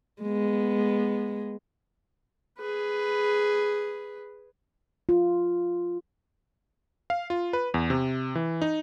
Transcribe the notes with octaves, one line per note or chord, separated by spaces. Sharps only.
G#3 B3
G#4 B4
F4
F5
F4
B4
E2
C3
E3
D#4